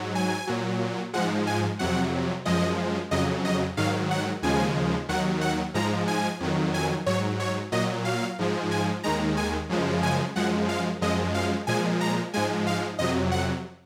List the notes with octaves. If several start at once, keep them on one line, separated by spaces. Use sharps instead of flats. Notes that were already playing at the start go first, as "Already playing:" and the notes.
Already playing: G#2 F#3
G#5
A#2 F#3
G#2 F3 G#3 F#5
G#5
F2 C3 F#3 F#5
F#2 F3 G#3 D#5
F2 C#3 F#3 D#5
D#5
G#2 D#3 F#3 F5
F#5
D#2 C#3 F3 G#3 G#5
D#2 D#3 F#3 F#5
F#5
G#2 F3 G#3 A#5
G#5
F2 D#3 F#3
G#5
G#2 F#3 C#5
C#5
A#2 F#3 D#5
F5
G#2 F3 G#3
G#5
D#2 D#3 G#3 A#5
G#5
F#2 C#3 F3 G#3
G#5
F#2 F3 G#3 F#5
F5
F#2 F3 G#3 D#5
F5
A#2 F3 G#3 G#5
A#5
G#2 F3 G#3 G#5
F5
F2 C3 F#3 D#5
F#5